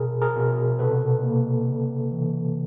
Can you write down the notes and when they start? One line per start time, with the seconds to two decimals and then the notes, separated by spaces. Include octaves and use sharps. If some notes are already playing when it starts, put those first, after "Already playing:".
Already playing: B2 G#4 A#4
0.21 G#4 A#4
0.36 B2
0.79 C3 A4 B4
1.23 A#3
1.68 C#3
2.12 E3